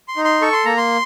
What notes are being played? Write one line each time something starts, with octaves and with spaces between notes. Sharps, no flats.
C6
D#4
C6
A4 C#6
C6
A#3 A#5
C6